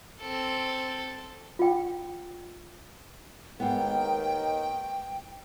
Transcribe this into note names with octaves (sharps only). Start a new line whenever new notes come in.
C4 A4
F4 G5
D#2 G#2 D#3 B3 G5